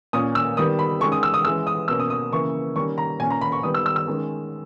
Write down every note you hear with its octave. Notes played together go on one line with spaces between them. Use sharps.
A#2 A#3 C#4 D#6
E6
D#3 G3 B3 D#6
B5
D#3 G#3 C#4 C#6
D#6
E6
D#6
E3 G#3 C#4 E6
D#6
B2 A#3 C#4 E6
D#6
D#6
C#3 E3 A#3 C#6
D#3 G3 A#3 C#4 C#6
A#5
A#2 A#3 C#4 G#5
A#5
B5
C#6
D#3 G3 B3 D#6
E6
E6
E6
D#3 G#3 C#4